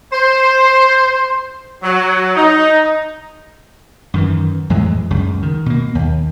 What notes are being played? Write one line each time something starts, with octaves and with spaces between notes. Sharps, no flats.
C5
F#3
D#4
F#2 D#3 E3
F2 A2 E3 G#3
C#2 F#2 C#3
D#3
B2 A#3
D#2